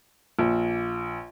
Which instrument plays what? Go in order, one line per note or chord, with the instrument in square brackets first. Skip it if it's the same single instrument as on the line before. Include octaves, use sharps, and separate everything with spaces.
[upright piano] A#1